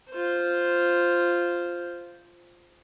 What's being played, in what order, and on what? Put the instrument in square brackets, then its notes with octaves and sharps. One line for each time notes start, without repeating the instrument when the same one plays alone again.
[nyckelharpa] F4 C5